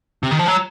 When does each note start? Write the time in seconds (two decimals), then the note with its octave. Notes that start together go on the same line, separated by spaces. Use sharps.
0.23 C3
0.31 D#3
0.39 F3
0.48 F#3